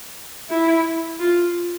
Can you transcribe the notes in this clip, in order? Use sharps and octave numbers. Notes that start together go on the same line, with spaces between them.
E4
F4